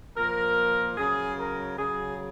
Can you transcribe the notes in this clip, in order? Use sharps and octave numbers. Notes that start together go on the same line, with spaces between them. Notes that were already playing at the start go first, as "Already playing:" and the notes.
A#2 F3 A#4
C#3 F#3 G#4
A#4
C#3 F#3 G#4